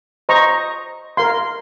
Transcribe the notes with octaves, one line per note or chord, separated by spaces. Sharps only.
C5 D#5 A#5 C#6
A#4 F5 C6